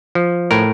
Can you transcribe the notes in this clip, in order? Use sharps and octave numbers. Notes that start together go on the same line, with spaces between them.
F3
A2 A#4